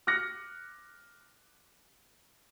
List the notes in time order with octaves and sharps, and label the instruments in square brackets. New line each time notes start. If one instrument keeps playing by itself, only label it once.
[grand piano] D6 F6 F#6 A#6 C#7